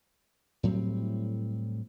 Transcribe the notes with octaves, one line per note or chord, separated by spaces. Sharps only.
A2 F#3 G3 C4